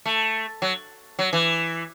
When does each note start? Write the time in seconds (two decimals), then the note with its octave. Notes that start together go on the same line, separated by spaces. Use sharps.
0.06 A3
0.62 F#3
1.19 F#3
1.33 E3